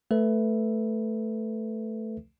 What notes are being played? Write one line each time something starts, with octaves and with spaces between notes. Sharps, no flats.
A3 A4 B4 E5